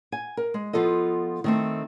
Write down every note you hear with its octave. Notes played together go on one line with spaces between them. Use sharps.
G#5
A#4
G#3
F3 B3 F4 A4 D#5
D#3 A3 C4